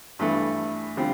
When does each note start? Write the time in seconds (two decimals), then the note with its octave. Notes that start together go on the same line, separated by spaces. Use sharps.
0.19 G2 E3 A3
0.97 D3 G3 C4 F4